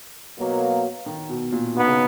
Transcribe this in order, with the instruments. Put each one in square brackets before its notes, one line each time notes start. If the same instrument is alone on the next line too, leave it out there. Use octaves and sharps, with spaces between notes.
[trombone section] B2 F#3 A#3
[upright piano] D#3
B2
A#2
[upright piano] B2 [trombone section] B3 D#4
[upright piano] C#3